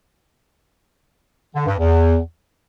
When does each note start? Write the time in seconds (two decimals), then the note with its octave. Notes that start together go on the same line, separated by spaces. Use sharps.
1.55 D3
1.66 G2
1.78 E2